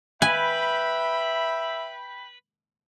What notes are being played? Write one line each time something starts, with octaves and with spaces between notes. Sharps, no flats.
B4 E5 G5 G#5 B5